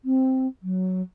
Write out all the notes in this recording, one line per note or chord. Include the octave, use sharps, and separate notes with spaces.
C4
F#3